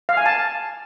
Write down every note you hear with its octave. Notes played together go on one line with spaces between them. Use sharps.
F5
G#5
A5